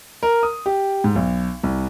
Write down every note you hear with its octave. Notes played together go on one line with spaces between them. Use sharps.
A#4
D#6
G4
G#2
B1
C2